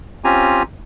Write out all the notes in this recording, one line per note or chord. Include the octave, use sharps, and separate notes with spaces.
C4 C#4 F4 G4 G#5 A#5